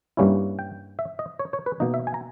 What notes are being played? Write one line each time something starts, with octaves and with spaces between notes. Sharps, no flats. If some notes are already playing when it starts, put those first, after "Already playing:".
G2 G3 A#3 C#4 E4
G5
E5
D#5
C#5
C#5
B4
B2 A#3 D#4 D#5
E5
G#5
A#5